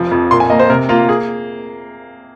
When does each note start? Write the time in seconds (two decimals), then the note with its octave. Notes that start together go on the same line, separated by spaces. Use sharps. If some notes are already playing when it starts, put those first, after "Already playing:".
Already playing: F1 F3
0.11 F2
0.31 A#2 C6
0.40 G#5
0.50 A#3 D#5
0.59 C5
0.70 C3 A#4
0.89 A#3 F4
1.09 G#4